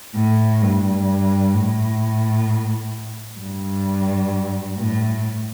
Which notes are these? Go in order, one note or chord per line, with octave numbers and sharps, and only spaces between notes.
A2
G2
A2
G2
A2